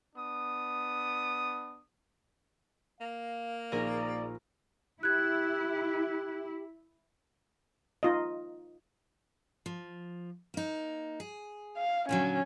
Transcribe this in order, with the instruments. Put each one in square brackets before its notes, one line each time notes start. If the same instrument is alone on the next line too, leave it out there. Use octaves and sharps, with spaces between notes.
[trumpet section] B3 D4 D#6
[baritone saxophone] A#3 [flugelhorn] F5
[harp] A#1 G#4 A#4 [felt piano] A#2 D#4 [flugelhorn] D5
[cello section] E4 [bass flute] G4 [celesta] F#6 G#6
[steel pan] D#4 F4 D#5
[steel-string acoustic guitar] F3
A#3 D#4
G#4
[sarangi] F5
[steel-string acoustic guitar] A#2 D3 F#3 [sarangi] C#4